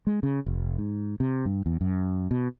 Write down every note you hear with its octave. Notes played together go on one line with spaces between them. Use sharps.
G#3
C#3
F1
G#2
C3
G2
E2
F#2
B2